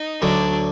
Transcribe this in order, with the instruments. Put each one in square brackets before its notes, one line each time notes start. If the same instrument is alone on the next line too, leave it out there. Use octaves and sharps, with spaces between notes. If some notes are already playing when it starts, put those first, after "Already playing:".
Already playing: [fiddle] D#4
[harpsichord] D2 D3 F#3 [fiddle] D4